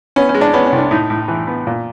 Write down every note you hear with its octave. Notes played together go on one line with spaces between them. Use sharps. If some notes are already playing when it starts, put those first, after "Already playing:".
B3 C#4
C#4
G#3
D4
B3 C#4
C#4
C2
D4
A2 D#4
A2
E3
B3
A#2